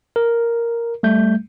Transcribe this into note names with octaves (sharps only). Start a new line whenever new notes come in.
A#4
G3 A3 G6